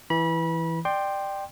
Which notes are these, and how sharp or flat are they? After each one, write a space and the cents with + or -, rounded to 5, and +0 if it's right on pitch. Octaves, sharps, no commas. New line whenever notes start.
E3 +0 B5 -30
D5 +25 G5 +0 C6 +10